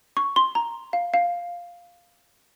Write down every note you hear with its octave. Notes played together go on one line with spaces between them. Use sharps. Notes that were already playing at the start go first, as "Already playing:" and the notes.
C#6
C6
A#5
F5
F5